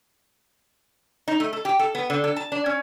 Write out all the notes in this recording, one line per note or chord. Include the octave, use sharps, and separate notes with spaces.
D#4
A3
A4
G4
A4
B3
D3
A4
A5
D4
C#4